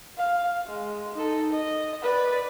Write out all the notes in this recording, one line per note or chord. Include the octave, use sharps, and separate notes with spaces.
F5
G#3
D#4 A4
D#5
B4 D5